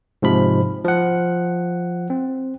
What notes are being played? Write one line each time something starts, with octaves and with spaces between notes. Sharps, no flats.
G#2 C3 F3 B5
F3 F#5
C4